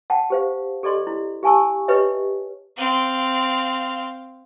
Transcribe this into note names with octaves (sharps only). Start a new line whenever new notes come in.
F#5 G5 A5
G4 C5 F5
G4 A4 D5 D#5 C6
E4
G4 F5 G#5 A5 C#6 E6
G4 B4 C#5 D#5 E5
C4 F5